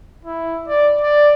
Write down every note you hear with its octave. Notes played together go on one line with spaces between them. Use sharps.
E4
D5
D5